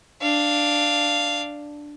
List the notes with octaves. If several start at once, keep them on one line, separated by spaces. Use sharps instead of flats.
D4 F5